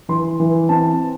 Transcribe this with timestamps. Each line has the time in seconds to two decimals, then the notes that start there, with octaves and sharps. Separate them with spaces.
0.09 E3 C6
0.40 E3
0.69 C4 A5